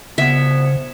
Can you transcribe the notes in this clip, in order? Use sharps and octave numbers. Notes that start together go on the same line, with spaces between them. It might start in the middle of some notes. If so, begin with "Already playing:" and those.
C2 C#3 F3 B3 E5